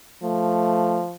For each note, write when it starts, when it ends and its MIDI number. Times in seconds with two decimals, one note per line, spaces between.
0.23 1.16 53
0.23 1.02 57